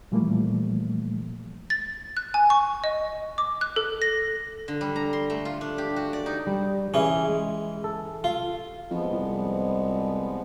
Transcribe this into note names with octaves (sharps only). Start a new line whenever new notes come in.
A#2 E3 F3 G3 A3 A#3
A6
F#6
G#5
C#6
D#5
D6
F#6
A4
A#6
D3
G3
A#5
C6
A3
F4
D4
G4
F#4
D5
D#4
G3
E3 C#4 G#4
G#3
A4
F4
F2 F3 G#3 B3
C2